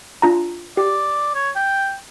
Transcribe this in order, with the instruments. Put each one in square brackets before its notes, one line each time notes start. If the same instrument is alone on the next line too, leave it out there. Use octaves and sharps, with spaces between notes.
[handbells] D4 F4 A#5
[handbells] G4 [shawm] D5
[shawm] C#5
G5